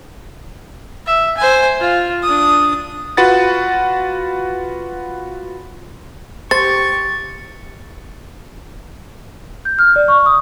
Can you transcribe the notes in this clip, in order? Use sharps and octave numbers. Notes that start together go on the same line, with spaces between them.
E5
C5 G#5
F4
D4 D#6
F4 F#4 B4 F#5 A6
G4 C5 C#6 A6
G6
F6
D5
C#6
D#6